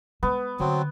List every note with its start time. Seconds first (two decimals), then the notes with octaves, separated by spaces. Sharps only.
0.23 G#3 B3
0.60 D3 F#3 C4